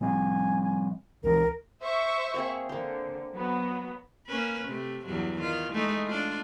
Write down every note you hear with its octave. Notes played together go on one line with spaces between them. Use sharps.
F3 G3 C4 G#5
C#2 E3 A#4
C5 E5 C#6
A#3 C4 G#4
D3 A#3 C5
F#3 B3
A#3 C#4 B4
C3 A3
E2 G2 F#3
D#3 F4
G#3 A3 D#4
D4 F4